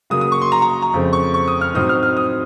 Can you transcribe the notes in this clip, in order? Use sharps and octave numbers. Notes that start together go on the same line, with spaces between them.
C#3 F#3 A#3 D#6
D#6
C#6
C6
A#5
A#5
A#5
F2 C#3 A3 C4
C#6
C#6
D#6
F6
A2 F#3 C4 D#4 D#6
F6
F6
D#6